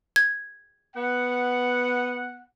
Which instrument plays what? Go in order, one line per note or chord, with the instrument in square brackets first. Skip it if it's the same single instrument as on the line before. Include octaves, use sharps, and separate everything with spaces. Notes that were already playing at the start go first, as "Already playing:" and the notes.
[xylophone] G#6
[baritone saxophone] B3 [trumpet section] F#5